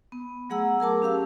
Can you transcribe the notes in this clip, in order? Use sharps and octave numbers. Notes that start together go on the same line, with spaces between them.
B3
F#3 A3 G#4 F#5 A#5 E6
G#4 A#4 A5 D6
C#4 G4 F5 E6